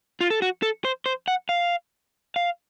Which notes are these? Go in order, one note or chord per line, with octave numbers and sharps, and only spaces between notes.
F4
A4
F#4
A4
C5
C5
F#5
F5
F5